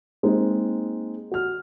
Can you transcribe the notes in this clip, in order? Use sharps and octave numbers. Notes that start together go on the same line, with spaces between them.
G#3 A#3 C4 D#4
F#4 F6